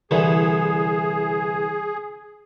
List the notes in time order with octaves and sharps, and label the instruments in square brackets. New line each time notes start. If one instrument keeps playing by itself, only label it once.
[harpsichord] C2 D3 E3 [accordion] G#4